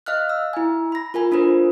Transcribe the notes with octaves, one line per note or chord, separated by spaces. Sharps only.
D#5 F5 F6 F#6
E6
E4 G#5
B5 A#6
F4 A#4 G#5 B5
D4 F4 A4 A#4 C5